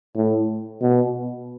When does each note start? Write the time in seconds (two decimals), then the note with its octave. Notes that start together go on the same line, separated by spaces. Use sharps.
0.16 A2
0.81 B2